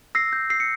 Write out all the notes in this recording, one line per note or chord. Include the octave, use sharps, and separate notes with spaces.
E6 A#6 C7
G6
E6 C7
C#7